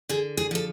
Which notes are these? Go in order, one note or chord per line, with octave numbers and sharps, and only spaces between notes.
D3 G#4
G#4
F3 A4